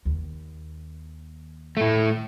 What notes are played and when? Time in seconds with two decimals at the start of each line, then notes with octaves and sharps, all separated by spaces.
0.05 D#2
1.77 A2 A3